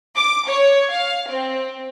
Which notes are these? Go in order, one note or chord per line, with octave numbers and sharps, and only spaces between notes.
D6
C#5
F5
C4